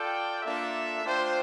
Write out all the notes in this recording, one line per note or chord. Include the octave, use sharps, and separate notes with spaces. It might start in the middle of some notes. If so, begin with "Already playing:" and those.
Already playing: F4 A4 D5 G5
A#3 D4 F4 A4 E5
A3 D4 F4 C5 G5